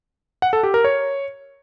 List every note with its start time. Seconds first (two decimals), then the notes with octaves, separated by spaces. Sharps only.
0.42 F#5
0.53 A4
0.63 G4
0.74 A#4
0.84 C#5